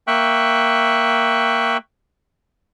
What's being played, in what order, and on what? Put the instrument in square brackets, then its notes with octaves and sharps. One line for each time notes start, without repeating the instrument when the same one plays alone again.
[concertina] A#3 E5 G5 C#6 F#6